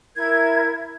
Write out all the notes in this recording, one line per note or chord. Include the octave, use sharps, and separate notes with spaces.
E4 A#4 G#6